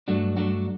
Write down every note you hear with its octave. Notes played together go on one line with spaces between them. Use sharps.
G2 F#3 A3 D4 F#4
G2 F#3 A3 D4 F#4